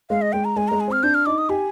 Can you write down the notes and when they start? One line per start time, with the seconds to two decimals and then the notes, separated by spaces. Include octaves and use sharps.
0.10 G#3 F5
0.22 D#5
0.33 G#3 G5
0.45 A#5
0.56 G#3 G#5
0.68 G#3 A#5
0.80 G#5
0.88 C4 F6
1.03 D4 G6
1.14 F6
1.26 D#4 D6
1.38 D#6
1.49 G4 G#5